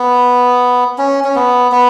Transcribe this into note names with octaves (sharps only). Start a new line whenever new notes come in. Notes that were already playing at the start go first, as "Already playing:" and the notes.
Already playing: B3
C#4
C#4
B3
B3